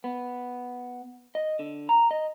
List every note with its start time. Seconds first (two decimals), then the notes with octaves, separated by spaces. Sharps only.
0.04 B3
1.35 D#5
1.59 D3
1.89 A#5
2.11 D#5